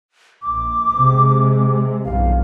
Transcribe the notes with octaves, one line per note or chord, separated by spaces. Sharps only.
A#1 D6
C3 G#3
B1 E2 G2 F5